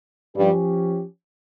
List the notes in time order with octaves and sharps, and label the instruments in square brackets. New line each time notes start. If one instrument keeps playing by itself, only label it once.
[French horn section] G2 G3 [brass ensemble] F3 C#4 G4